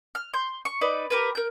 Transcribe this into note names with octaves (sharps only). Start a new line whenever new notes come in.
F6
C6 G6
C#6
D#4 B4 D5
G4 A#4 B4
A#4 G6